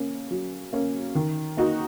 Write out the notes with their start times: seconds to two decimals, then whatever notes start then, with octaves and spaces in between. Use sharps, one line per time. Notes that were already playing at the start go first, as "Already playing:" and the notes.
Already playing: A#3 C#4
0.31 F#3
0.73 A#3 C#4
1.15 D#3
1.57 A#3 D#4 F#4